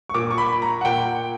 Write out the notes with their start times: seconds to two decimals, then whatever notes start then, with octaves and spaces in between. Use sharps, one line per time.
0.09 C#6
0.14 A#2 D6
0.31 C#6
0.38 B5
0.62 A#5
0.81 F#5
0.85 A#2 G5